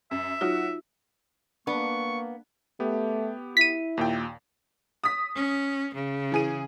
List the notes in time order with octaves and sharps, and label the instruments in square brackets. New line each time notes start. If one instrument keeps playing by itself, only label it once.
[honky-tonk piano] F#2 [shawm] E5
[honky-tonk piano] F#3 F#4 [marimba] D#4 F4
[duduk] A#3 [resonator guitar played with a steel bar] B3 [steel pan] D4 [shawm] C#6
[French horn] A3 [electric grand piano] B3 G4
[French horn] E4 [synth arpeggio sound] B6 D#7
[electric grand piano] D#2 A#2 G5
[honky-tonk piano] D#6 B6
[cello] C#4
C#3
[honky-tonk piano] E3 G#4 D#7